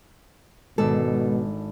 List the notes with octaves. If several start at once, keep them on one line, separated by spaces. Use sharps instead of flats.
G#1 B2 G#3 D4 A4